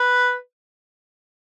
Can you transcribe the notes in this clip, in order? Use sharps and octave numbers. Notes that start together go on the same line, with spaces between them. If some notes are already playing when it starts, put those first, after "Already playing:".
Already playing: B4